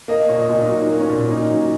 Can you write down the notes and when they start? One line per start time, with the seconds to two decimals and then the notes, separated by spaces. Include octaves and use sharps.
0.08 A#3 D#5
0.28 A#2 C#5
0.40 D#5
0.50 A#2
0.62 D#4
0.69 F#3 F#4
0.90 A#3
1.00 C#4
1.09 A#2
1.31 A#2 D#4
1.50 F#3